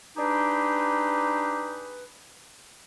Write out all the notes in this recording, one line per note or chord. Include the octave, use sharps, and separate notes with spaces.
D4 D#4 G4 G#4 B4